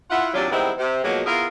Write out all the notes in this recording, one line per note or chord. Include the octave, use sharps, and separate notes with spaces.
E4 F4 F#5
D#2 C3 F#3 D4 F4 D5
D#3 G3 G#3 B3 C4 E4
C3
B2 F3 F#3 G#3 A#3
B3 E4 F4 G#4 A#4